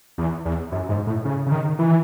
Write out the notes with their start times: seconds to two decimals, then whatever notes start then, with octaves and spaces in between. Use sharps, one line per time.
0.18 E2
0.45 E2
0.72 F#2
0.89 G#2
1.07 A2
1.25 C#3
1.46 C#3
1.52 D#3
1.79 E3